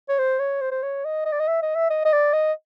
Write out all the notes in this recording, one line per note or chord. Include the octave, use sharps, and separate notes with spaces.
C#5
C5
C#5
C5
C5
C#5
D#5
D#5
D5
D#5
E5
D#5
E5
D#5
D#5
D5
D#5